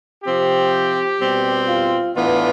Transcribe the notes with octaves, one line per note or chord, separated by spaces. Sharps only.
C3 F3 C4 G4
B2 G3 C4
F4
A2 E3 B3 D4 F4